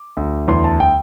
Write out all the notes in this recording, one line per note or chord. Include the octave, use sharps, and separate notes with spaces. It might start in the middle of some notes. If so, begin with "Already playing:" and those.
Already playing: D6
D2
E2 C6
A5
G5